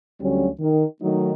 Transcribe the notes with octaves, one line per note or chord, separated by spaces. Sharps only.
D2 D3 F#3 G3 C#4
D#3
D#3 F#3 A3 D#4